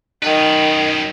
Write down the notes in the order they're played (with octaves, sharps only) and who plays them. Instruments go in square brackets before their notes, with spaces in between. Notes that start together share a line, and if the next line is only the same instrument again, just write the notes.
[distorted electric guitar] F#2 B4 [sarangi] D#3